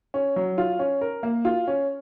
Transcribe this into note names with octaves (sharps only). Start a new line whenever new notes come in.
C#4
F#3
F4
C#4
A#4
A#3
F4
C#4